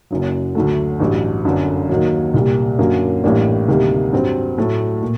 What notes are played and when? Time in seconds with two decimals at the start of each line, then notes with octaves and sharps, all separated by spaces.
0.11 F#1 F#2 F#3
0.55 D2 D3 F#3 A3
1.00 A1 G2 F#3
1.45 G1 F#2 D3
1.89 D#2 D#3 F#3
2.34 C2 A#2 G3
2.79 F#2 D3 F#3 A#3
3.24 A1 A2 G3 A#3 D4
3.68 D2 C3 D#3 G3 A#3
4.13 G2 F#3 C4
4.58 A2 F#3 A3
5.02 A#2